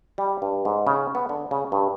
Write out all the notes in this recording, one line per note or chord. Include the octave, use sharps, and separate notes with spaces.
G3
G2
G#2
C#3
B3
D3
C#3
G2